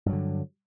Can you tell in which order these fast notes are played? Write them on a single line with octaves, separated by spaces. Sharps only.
G2 F#3 D3